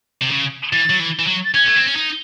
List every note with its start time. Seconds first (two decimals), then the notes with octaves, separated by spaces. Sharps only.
0.21 C3
0.31 C#3
0.72 E3 A6
0.90 F#3
1.00 E3
1.19 E3
1.27 F#3
1.45 A6
1.54 C#4 G#6
1.66 A3
1.76 C4
1.87 C#4
1.96 D#4